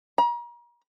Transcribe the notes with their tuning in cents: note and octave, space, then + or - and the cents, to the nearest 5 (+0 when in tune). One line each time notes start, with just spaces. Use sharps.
A#5 +40